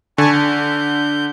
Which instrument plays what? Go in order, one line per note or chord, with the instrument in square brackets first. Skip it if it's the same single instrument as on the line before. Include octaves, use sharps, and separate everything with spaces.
[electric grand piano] D3 [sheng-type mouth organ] G#5 A5 C#6
[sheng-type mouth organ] G6